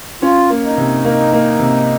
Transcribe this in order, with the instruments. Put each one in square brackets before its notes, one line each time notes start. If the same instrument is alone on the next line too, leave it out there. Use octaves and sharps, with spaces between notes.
[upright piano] C#4 [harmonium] F4
[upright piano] A#3
[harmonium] D#4
[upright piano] C3
A#3
A#3
C3